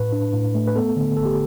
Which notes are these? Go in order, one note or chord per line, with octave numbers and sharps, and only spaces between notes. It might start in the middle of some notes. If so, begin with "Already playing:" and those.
Already playing: A2 B4
D4
A2
A3
B4
B3 A4
D3
G1 A4
G4